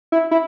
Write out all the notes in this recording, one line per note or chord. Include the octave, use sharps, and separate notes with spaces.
E4
E4